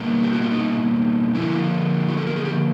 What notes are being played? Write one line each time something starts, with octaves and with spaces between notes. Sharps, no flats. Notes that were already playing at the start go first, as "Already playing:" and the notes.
Already playing: B2 G3 A#3
G4
F#4
F4
D#4
D3 F3 A#3 E4
F#4
A4
A#4
G#4
G4